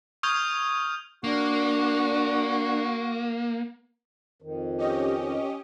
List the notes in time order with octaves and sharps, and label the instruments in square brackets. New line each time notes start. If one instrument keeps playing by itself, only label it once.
[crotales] C#6 D#6 F6 G6 G#6 F7
[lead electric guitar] A#3 [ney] D4 [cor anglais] F#4
[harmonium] F2 D#3
[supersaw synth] C#4 G4 D#5